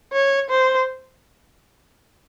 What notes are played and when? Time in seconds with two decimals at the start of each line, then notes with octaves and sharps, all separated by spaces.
0.13 C#5
0.50 C5